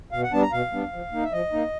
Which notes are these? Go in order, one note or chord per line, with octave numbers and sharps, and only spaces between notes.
B2 F5
F#5
G3 B3 D4 A5
A#5
B2 F5
G3 B3 D4
F3
A#3 D#4
E5
F3 D#5
A#3 D#4